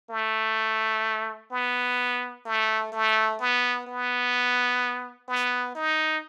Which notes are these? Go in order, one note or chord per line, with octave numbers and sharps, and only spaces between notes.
A3
B3
A3
A3
B3
B3
B3
D#4